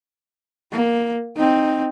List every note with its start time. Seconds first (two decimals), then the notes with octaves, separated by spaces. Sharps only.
0.72 A#3
1.36 C4 D#4